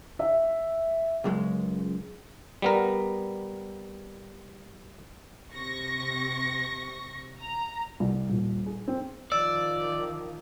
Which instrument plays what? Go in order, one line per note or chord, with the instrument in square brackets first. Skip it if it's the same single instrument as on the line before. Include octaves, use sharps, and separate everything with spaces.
[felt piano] E5
[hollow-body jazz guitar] C#2 F#2 G#3
[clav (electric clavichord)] G3 B3 A#4
[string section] C3 C#6 A#6
A#5
[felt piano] C2
D#1
G#4
C4
[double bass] D#3 F3 [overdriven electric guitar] D5 [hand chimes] E6